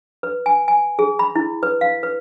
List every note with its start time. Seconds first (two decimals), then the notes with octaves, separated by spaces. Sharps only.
0.23 B4
0.46 G#5
0.68 G#5
0.99 G#4
1.19 B5
1.36 E4
1.63 B4
1.81 F5
2.03 B4